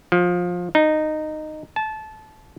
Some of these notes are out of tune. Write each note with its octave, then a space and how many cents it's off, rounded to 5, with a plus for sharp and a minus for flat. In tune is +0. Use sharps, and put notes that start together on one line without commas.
F3 +20
D#4 -15
A5 -20